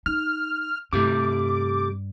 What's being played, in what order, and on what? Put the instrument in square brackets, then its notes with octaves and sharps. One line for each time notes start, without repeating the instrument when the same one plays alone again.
[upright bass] D#4 [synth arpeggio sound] F6
[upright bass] G2 [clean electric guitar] C3 G3 A3 [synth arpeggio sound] D6